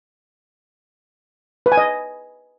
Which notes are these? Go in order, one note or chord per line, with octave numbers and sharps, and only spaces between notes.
B4
G#5
D#5